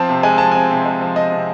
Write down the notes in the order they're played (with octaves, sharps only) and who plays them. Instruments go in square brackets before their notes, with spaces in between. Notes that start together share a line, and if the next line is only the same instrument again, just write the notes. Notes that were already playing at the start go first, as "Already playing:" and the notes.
Already playing: [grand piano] F3 C4 A5
C3
G#3 G#5
F3 A5
C4 G#5
C3
G#3
F3
C4 D#5
C3